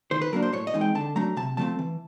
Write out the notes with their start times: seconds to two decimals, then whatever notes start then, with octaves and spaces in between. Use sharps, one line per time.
0.11 D#3 C5
0.21 B4
0.33 F#3 A#3 D4 A#4
0.43 C5
0.53 A2 C#5
0.67 D#5
0.74 E3 G#3 C4 D#4
0.81 G5
0.95 D3 A5
1.16 F#3 A3 D4 A#5
1.37 C3 A5
1.57 F3 A3 C4 A5
1.79 E3